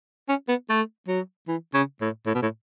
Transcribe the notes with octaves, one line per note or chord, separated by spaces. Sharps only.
C#4
B3
A3
F#3
E3
C#3
A2
A2
B2
A2